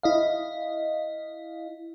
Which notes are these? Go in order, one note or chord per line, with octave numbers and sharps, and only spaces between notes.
E4 D#5 F5